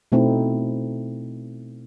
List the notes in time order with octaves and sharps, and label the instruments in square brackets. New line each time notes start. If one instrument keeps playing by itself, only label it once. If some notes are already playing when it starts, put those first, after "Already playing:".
[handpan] B2 A3 C4 D#4 E4